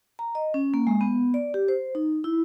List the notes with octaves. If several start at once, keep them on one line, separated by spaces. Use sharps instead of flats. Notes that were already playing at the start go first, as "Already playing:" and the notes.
A#5
D#5
C#4
A#3
G#3
B3
D5
G4
C5
D#4
E4